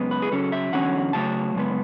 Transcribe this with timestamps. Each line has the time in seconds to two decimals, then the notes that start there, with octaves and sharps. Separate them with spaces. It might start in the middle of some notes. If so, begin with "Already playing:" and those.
Already playing: F#2 C#3 G#3 B3
0.11 B4
0.22 G#4
0.31 C#3 F#3 C#4 A4
0.52 E5
0.73 E2 D3 F#3 C#4 F#5
1.13 C#3 F#3 A3 A5
1.55 F#2 C#3 G#3 B3